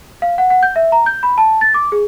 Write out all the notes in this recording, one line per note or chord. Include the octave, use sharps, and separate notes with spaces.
F5
F#5
F#5
G6
E5
A#5
G6
B5
A5
A6
D6
G#4